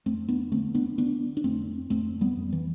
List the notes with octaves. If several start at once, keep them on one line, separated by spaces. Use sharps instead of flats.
F2 A3 C4
B3 D4
D3 A3 C4
B3 D4
D3 B3 D4
D4
F2 A3 C4
F2 A3 C4
G3 B3
F2
E3